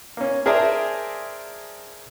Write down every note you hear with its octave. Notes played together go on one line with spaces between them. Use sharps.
A#3 C#4
G#4 A#4 C5 D5 E5 A5